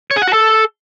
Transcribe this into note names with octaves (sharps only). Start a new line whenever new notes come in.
C#5
G#4
F#5
F#4
A4